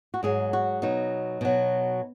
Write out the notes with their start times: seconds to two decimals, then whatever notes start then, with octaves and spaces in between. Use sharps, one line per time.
0.14 F#4
0.23 G#2 F#3 G#4
0.53 F#4
0.82 B2 F#3 D#4
1.41 B2 F#3